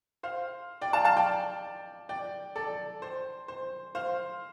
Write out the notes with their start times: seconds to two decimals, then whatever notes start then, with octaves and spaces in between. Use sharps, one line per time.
0.23 C5 F5
0.81 D5 G5
0.93 F5 A5
1.05 F5 A5
1.17 D5 G5
2.09 D5 G5
2.56 A4 D5
3.02 C5
3.48 C5
3.95 C5 F5